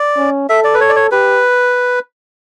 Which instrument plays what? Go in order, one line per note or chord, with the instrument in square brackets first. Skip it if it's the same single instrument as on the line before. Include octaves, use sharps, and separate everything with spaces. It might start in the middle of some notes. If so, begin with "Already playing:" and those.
Already playing: [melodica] D5
[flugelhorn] C#4
[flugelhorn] A4 [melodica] E5
[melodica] D5
B4
C#5
D5
C#5
[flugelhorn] G4 [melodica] B4